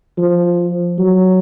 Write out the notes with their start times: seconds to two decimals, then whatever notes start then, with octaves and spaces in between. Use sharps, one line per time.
0.18 F3
0.99 F#3